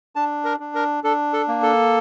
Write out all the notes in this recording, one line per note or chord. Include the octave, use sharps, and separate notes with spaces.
D4 A5
A#4
D4
A#4
D4 A4
A4
A#3
A4